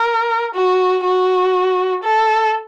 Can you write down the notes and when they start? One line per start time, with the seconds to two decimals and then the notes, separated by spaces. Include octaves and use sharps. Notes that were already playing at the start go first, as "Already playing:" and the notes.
Already playing: A#4
0.56 F#4
1.05 F#4
2.04 A4